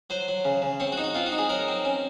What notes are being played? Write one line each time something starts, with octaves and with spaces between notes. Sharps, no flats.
F#3 C5
F#3
C#3
C#3
C4 C#5
F#4
D#4
F#4
C4 F4
F#4
D#4
G#4
F#3 A#4
C4
C#4